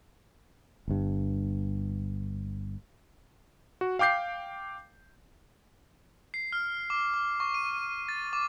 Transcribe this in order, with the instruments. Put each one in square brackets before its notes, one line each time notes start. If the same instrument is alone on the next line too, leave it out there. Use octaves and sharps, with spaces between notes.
[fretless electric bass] G1 G2
[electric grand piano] F#4
F5 G5 D6 G6 C7
[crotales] C7
F6
D6
D6
C#6
D#7
A6
D6